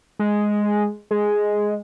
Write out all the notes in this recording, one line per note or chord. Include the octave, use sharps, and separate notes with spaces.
G#3
G#3